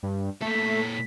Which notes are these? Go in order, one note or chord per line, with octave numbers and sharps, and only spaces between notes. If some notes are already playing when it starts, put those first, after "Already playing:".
G2
A#2 A3 A4 B6